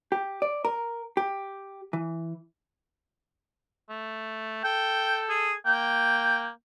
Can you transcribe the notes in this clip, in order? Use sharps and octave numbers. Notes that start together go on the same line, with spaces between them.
G4
D5
A#4
G4
E3
A3
A4 G5
G#4
A#3 G5